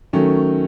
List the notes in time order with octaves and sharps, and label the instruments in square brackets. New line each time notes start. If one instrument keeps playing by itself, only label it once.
[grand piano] D#3 F#3 A3 C#4